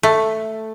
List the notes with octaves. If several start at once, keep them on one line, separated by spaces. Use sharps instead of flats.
A3